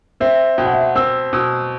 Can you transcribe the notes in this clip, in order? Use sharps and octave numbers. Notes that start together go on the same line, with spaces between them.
C4 E5
B2 G5
F#5
E5
F#5
C4 E6
B2 E6